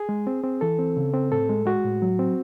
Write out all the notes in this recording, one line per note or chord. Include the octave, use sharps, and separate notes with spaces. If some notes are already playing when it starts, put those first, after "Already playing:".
Already playing: G#4
G#3
C4
C4
E3 A4
C4
C#3
C4
A2 A4
G#3
G#3 F#4
A2
F#3
C4